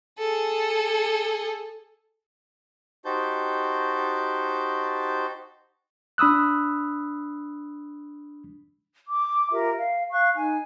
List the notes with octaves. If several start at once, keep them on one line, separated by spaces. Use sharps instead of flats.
G#4 A4
D#4 F#4 G4 C5 A5 G6
D4 B5 D#6 E6 F#6
D6
F4 G4 A#4 E5
F5
F5 C#6 F#6
D#4 G#5